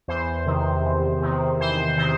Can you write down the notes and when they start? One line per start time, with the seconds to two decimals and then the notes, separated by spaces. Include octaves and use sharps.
0.08 E2 C5
0.46 C3 D#3
0.84 E2
1.22 C3 D#3
1.60 E2 C5
1.98 C3 D#3 C5